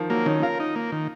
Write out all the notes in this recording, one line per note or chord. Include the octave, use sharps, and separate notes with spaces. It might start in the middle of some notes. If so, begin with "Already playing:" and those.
Already playing: D#3 F3
F#3 A#3
D#3 C#4
F4 A#4
D#4
A#3
D#3